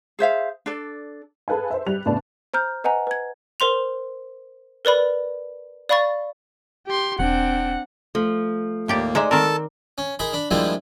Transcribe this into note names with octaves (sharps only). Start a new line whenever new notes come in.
G#4 C5 E5 F5
D4 A4 D5
G#4 A4 B4 F5 G#5
C5 E5
G3 F#6 F7
E2 A2 C#3 D4 B4 A5
C5 A#5 F6 G6
B4 D#5 F#5 G#5 A#5
B4 G#6
A#4 C5 C6 F7
A#4 B4 D5 B5
D5 F5 B5 C#6 A6
G4 C6
E1 C4 D4 F#5
F3 A3
D#2 A2 A#3 G4 D5
G#3 D#4 C5 D5 E5
D#3 C4 A4 A#4 A5
C#4
D#4 G#4 A#4 B5 C6
D4 B5
F3 G3 G#3 A#3 D4 E4